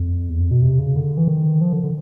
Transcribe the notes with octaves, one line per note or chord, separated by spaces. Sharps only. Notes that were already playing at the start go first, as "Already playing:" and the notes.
Already playing: F2
E2
F2
B2
C3
C#3
D3
E3
D#3
F3
D3
D3